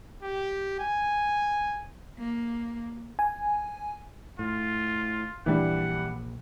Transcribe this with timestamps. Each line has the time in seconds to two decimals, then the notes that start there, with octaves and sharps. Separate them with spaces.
0.23 G4
0.80 G#5
2.18 A#3
3.19 G#5
4.39 A2 F4
5.46 A#1 E3 G3 D4 F#5